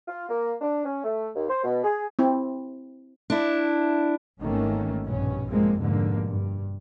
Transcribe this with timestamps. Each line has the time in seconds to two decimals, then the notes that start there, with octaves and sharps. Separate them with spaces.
0.08 F4
0.29 A#3
0.62 D4
0.85 C#4
1.04 A3
1.35 D#2
1.49 C5
1.64 B2
1.84 G#4
2.19 C4 E4
3.30 D4 E4
4.41 G#1 D#3 E3 A3 A#3 C#4
5.03 A#1 G2 B2 C#4
5.48 G2 F3 G#3 A#3 C4
5.78 F1 F2 G#2 B2 D3 A#3
6.26 G2